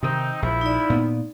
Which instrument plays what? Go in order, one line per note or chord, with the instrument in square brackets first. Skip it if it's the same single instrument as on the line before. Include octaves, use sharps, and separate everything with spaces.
[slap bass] C3 D#3 [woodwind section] C4 D#4
[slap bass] A#1 [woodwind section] F3 E4
[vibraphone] D#4 D5
[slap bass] A#2 B3